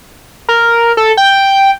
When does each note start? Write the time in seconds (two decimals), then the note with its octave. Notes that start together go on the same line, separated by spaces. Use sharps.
0.49 A#4
0.97 A4
1.17 G5